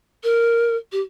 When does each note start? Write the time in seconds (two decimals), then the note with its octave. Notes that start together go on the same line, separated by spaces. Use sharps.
0.24 A#4
0.92 G4